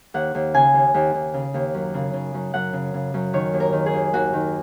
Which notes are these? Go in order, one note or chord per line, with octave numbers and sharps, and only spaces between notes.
D#2 F#5
D#2
C#3 G#5
D#2
D#2
D#2
C#3
D#2
F#2
C#3
C#3
F#2
F#2 F#5
C#3
C#3
F#2
D#3 C#5
D#2
A#4
D#3
G#4
D#2
D#2 F#4
D#3